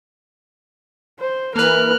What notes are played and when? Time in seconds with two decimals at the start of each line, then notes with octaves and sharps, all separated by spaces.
1.20 C5
1.56 E3 A#3 A#4 B4 F6 F#6